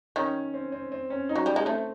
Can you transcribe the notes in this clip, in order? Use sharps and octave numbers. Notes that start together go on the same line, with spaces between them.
D#3 C#4
C4
C4
C4
C#4
D#4
F#3
G3
G#3
A3 C4